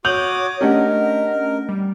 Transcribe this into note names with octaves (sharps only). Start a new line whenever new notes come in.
F#4 C#5 D6 D#6 G6 F7 F#7
A3 C#4 D4 G4 A#4 D#5 F#5
G3